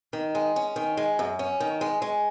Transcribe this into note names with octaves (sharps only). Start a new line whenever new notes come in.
D#3
G#3
C#4
D#3
G#3
F#2
C#4
D#3
G#3
G#3